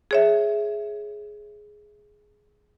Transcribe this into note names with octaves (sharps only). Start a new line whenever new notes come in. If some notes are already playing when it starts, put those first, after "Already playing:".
G#4 C#5 E5